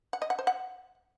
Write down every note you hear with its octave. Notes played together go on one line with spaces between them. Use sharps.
F#5
D#5
F#5
C5
F#5